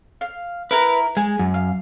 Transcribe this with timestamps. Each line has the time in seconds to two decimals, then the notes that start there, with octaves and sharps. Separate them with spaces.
0.21 F5
0.71 E4 A#4 B4 A#5
1.17 G#3 G#5
1.39 F#2
1.54 F5